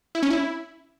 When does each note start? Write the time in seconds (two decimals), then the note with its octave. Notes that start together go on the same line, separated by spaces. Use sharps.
0.15 E4
0.23 C#4
0.30 E4